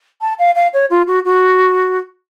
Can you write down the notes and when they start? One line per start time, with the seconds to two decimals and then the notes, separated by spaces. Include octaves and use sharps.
0.21 A5
0.39 F5
0.55 F5
0.73 C#5
0.90 F4
1.07 F#4
1.25 F#4